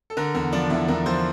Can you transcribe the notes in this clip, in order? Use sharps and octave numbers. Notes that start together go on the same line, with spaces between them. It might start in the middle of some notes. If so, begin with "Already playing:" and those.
A4
D3 A#4
E2 A#4
F3 D4
E2 E4
E2 A#4
F3 C5